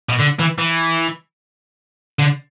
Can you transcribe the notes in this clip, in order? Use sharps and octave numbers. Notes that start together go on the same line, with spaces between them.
B2
D3
E3
E3
D3